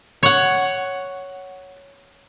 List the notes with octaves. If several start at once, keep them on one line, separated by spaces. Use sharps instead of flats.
C#5 F#5